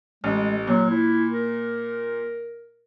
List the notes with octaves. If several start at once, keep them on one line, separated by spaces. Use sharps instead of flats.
A1 G#3
A#2 F#3
E4
A#4